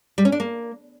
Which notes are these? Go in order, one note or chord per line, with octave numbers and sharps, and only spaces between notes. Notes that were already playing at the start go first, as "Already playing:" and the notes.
G3
C#4
D4
A#3